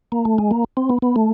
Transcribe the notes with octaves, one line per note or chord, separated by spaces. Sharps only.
A#3
A3
G#3
A#3
C4
B3
B3
A3